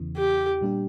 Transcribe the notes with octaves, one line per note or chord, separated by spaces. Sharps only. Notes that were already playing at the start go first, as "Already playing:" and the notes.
Already playing: E2 C#3 E3
G4
A#2 G3 D4 G4